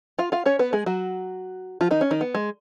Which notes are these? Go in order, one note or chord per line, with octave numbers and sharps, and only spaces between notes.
F4 F5
F4 F5
C#4 C#5
B3 B4
G#3 G#4
F#3 F#4
F3 F4
D#3 D#4
C#4
D#3 D#4
B3
G#3